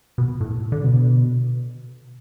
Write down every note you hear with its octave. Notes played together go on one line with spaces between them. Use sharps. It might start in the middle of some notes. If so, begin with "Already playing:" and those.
B2
A2
D3
B2